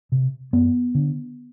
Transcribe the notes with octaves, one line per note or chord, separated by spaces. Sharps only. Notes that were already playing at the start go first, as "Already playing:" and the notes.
C3
F#2 B3
D3